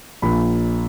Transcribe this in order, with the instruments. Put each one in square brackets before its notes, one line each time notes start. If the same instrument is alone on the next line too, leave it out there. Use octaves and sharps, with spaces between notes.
[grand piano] A#1 A#2 B5